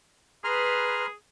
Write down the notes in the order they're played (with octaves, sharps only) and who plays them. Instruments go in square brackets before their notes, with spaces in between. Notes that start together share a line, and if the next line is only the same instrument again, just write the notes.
[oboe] G#4 [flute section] B4 [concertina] A#5 C6 F6